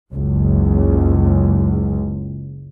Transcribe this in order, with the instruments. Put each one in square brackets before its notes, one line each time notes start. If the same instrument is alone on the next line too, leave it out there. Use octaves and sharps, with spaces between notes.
[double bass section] F#1 C#2